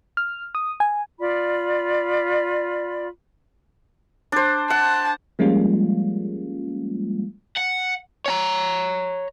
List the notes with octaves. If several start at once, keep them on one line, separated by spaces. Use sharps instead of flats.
F6
D#6
G#5
F4 D5 B5
D4 C5
F#5 A5
F3 G3 G#3 A#3 C#4 F4
F#5
C#5 G#5 A#5